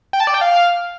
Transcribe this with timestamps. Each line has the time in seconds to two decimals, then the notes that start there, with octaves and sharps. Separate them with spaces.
0.13 G5
0.20 A5
0.27 D5
0.34 G5
0.41 F5